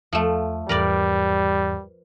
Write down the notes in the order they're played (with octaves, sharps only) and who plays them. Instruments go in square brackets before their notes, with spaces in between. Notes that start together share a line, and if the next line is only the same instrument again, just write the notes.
[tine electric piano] E2 [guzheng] F3 A3
[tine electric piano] E2 G#2 E3 [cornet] G3 [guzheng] A#4 B4 D5